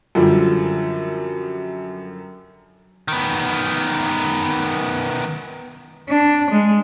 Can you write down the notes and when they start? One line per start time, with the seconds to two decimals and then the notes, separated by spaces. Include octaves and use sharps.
0.15 F#2 D3 F3 G3
3.08 D#3 B3
6.09 D4
6.51 G#3